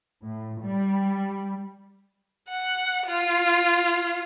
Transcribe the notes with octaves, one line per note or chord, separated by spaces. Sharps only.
A2
G3
F#5
F4